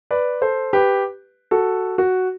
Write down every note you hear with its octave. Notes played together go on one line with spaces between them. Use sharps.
B4 D5
A4 C5
G4 B4
F#4 A4
F#4